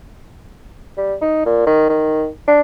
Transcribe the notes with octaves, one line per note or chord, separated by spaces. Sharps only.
G3
D#4
A#2
D#3
D#3
D4